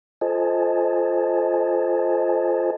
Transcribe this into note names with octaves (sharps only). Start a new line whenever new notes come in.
F4 A4 C5 D#5 G#5 A5